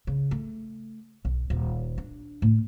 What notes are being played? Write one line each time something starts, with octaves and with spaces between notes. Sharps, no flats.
C#3
A3
B1
D#1
D4
A2